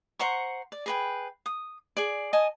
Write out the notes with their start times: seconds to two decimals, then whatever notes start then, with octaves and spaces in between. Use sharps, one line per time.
0.19 C5 F#5 A#5 C#6
0.72 D5
0.86 G#4 B4 G5
1.46 D#6
1.97 G#4 D5
2.33 D#5 G#5 A5 D#6